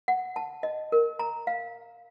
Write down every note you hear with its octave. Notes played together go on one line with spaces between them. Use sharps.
F#5
A5
D#5
A#4
A#5
F5